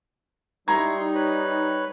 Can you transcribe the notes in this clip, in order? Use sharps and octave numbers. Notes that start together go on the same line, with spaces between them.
G3 D#4 E4 A#5 C6 C#6 G#6
B4 C#5 B5